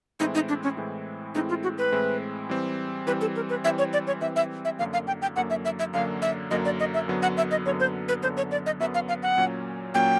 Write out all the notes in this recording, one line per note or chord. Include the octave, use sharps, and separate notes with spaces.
A2 E3 G#3 C4 D#4 E4
D#4
D4
C#4
A2 E3 G#3 C4 E4
A2 E3 G#3 C4 D#4 E4
F4
F#4
B4
A2 E3 G#3 C4 E4
E3 G3 C4
E3 G3 C4 B4
A4
A#4
B4
E3 G3 C4 E5
C#5
D5
C#5
E3 G3 C4 E5
E5
E5
F#2 D3 F#3 A#3 F5
F5
G5
G5
F#2 D3 F#3 A#3 F#5
E5
E5
E5
F#2 D3 F#3 A#3 F5
E5
F#2 D3 F#3 A#3 D#5
D5
D#5
E5
F#2 D3 F#3 B3
F#5
E5
D#5
F#2 D3 F#3 B3 C#5
C5
B4
F#2 D3 F#3 B3 C5
C#5
D5
D#5
F#2 D3 F#3 B3 E5
F5
F5
F#5
A#2 F#3 A#3 C#4
A#2 F#3 A#3 C#4 G5